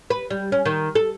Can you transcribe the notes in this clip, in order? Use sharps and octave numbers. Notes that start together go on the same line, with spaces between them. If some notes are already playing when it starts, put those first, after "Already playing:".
B4
G3
C#4
D#3
A4